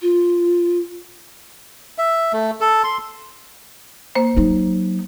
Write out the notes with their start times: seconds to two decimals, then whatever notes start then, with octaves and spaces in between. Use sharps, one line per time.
0.01 F4
1.98 E5
2.33 A3
2.61 A4
2.84 C6
4.15 A#3 C5
4.37 F#3 D#4